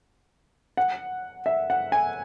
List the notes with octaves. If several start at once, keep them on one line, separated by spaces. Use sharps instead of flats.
F#5
E5
F#5
G#5